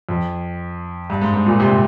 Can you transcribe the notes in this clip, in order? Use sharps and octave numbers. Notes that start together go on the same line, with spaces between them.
F2
G2
G#2
G#2
A#2
C3